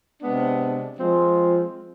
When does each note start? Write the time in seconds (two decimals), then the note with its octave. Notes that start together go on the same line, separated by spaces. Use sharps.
0.21 C3 G#3 B3 D4
0.99 F3 G#3 C4 F4